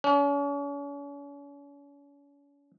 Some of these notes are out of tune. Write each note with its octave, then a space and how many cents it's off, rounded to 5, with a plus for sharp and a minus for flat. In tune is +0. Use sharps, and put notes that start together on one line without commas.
C#4 +40